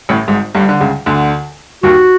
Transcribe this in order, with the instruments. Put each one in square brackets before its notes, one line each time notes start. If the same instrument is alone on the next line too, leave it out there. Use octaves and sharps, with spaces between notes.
[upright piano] A1 A2
G#1 G#2
G1 G2
D3
C#2 C#3
D2 D3
[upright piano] D#2 D#3 [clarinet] F#4